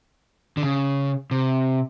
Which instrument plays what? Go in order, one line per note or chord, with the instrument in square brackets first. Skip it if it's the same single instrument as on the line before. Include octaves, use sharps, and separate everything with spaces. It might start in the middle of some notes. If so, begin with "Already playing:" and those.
[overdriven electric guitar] D3
C#3
C3